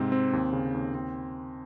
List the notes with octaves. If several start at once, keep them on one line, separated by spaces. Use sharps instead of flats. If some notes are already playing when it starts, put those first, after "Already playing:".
Already playing: G#2 C3 C4
C4
D#2
C#3
D#2
C4